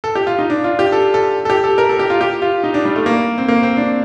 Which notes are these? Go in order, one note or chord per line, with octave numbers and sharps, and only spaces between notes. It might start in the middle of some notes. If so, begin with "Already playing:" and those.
A4
G4
F4
D#4
D4
F4
G4
A4
A4
A4
G4
A4
A#4
A4
G4
F4
G4
F4
D#4
D4
G3
A3
A#3
C4
A#3
C4
D4